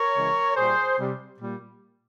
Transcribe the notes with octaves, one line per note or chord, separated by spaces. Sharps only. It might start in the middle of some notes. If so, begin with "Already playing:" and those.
Already playing: A#4 C#5
C#3 E3 G#3
A#2 G3 G#4 C5
C3 G3
A#2 G3